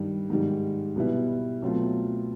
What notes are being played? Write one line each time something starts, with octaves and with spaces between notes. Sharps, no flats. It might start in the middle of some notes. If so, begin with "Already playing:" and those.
Already playing: G2 D#3 G3
G#2 D#3 G3
B2 G3 B3 E4
B2 F#3 A3 C4 F4